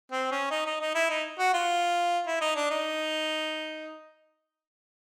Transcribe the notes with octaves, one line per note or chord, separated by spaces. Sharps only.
C4
C#4
D#4
D#4
D#4
E4
D#4
F#4
F4
E4
D#4
D4
D#4